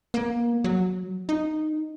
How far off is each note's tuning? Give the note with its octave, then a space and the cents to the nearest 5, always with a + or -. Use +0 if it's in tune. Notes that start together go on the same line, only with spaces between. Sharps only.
A#3 +25
F#3 -10
D#4 -10